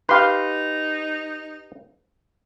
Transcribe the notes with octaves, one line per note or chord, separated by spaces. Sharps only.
D#4 G4 B4 F5 C6